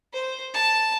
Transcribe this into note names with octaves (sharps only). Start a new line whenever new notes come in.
C5
A5